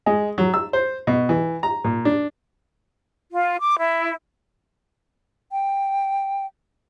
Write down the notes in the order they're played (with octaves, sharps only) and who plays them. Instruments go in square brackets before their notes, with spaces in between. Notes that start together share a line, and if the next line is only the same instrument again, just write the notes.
[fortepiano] G#3
F#3
E6
C5
B2
E3
A#5
A#2
D4
[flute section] F4
D6
E4
[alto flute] G5